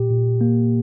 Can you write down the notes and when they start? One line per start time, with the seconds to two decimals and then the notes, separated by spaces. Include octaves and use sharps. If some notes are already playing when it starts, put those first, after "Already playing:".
Already playing: A#2 G4
0.10 A#2
0.41 A#3